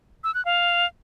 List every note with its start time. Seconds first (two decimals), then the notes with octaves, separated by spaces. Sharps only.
0.24 E6
0.35 F#6
0.45 F5